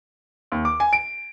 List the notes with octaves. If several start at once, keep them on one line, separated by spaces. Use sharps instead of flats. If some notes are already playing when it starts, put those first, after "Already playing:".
D#2
D6
G#5
D7